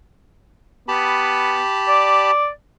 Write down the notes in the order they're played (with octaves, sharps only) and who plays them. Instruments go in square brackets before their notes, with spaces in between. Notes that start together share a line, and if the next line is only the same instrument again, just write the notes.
[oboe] B3 [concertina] G4 A5 B5
[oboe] D5